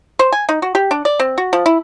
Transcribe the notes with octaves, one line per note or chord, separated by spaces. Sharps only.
C5
G#5
D#4
F#4
G4
D4
D5
C4
F#4
F3
E4